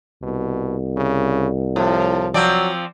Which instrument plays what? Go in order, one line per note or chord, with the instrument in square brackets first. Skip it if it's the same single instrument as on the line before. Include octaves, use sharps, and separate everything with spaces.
[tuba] C2 [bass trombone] B2
[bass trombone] C#3
[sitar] A2 [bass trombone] F3
[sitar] F3 C4 D5 [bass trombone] F#3